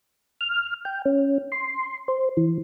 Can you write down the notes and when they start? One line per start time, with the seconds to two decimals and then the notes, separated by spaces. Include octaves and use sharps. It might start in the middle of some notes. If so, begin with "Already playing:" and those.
0.41 F6
0.85 G5
1.05 C#4
1.52 C6
2.08 C5
2.37 E3